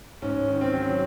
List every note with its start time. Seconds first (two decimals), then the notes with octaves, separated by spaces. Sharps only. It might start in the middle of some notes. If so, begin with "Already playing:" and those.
0.22 G#2 C#4
0.48 D#3
0.61 C4
0.74 F#3